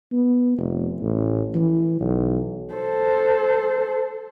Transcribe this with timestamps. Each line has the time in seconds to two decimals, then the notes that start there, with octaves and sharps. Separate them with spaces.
0.12 B3
0.58 F1
1.01 A1
1.55 E3
2.00 B1
2.74 A4 C5